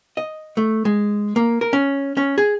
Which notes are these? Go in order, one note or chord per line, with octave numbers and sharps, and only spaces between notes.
D#5
A3
G#3
A#3
A#4
C#4
C#4
G#4